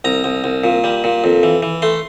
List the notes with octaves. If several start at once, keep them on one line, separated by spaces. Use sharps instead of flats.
C2 A#5
C2
C2
A#2
G3
A#2
F2
E3
E3
A3 C6